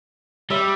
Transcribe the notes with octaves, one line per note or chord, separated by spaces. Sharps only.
G3 E5